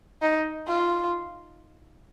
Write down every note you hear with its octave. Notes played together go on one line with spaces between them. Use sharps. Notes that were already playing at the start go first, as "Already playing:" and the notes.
D#4
F4